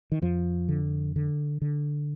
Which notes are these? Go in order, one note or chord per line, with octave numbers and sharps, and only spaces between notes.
D#3
F2 F3
D3
D3
D3